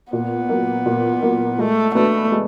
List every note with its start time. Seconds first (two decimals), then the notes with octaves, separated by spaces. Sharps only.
0.12 A#2 B3
0.49 F#3 A#3
0.86 A#2
1.23 F#3 A#3
1.59 G#3 A3
1.95 A3 B3 D4 F#4 B4
2.32 G#3